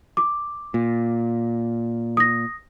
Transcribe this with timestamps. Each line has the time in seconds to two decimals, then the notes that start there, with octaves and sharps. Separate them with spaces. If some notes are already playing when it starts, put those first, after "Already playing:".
0.17 D6
0.74 A#2
2.17 D#6 A#6